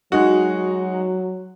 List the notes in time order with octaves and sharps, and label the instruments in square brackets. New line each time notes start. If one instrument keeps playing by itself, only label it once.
[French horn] F#3 [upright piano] G#3 D#4 F#4